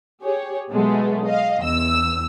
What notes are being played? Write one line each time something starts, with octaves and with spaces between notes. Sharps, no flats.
G4 G#4 C#5
B2 F#3 G#3 A3 B3
D#5 F5
E2 E6